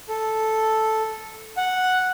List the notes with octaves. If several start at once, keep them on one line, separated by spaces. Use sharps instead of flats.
A4
F#5